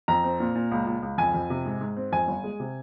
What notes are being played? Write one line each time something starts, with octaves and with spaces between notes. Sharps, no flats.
F2 A#5
C4
A#2
A#2
C#2
C#2
C#2
F2 G#5
F2
C3
G#2
G#2
C4
F2 G#5
G1
G#3
C3